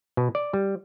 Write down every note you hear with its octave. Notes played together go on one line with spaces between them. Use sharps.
B2
D5
G3